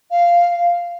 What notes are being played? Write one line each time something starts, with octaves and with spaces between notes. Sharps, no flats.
F5